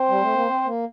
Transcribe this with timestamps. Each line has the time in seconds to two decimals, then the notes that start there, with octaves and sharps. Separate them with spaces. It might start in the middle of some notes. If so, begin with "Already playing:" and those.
Already playing: C4 C5
0.09 G3
0.22 A3
0.34 A#3
0.47 C4
0.66 A#3